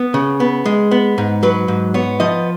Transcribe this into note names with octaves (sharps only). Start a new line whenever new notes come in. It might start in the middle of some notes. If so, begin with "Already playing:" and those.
Already playing: B3
C#3
B3
G#3
B3
G#2
F#3 B4
G#2
B3 C#5
F3 D#5